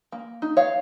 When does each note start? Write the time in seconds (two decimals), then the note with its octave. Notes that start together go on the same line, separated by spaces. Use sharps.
0.12 A#3
0.42 D#4
0.57 C#5 F5